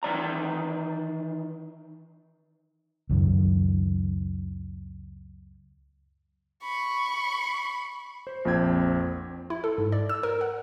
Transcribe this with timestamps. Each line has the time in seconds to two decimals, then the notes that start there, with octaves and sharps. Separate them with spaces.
0.03 D#3 E3 D5 A#5
3.09 C#2 F#2 D#3
6.65 B5 C#6
8.27 C5
8.45 A#1 F2 C4 G5 G#6
9.50 E4
9.64 A4
9.78 G#2
9.92 D5
10.09 E6
10.23 A#4
10.41 F#5